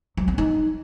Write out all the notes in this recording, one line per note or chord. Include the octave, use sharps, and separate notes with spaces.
F#3
C4
D#4